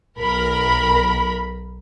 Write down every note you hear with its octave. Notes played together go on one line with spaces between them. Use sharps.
B1 A#4 B5